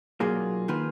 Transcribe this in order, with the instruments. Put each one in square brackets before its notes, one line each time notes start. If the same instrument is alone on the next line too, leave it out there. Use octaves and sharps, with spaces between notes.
[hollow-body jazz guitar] B1 A#2 F#3 A#3 F4 [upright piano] G#4
[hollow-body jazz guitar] D#3 A#3 F4 B4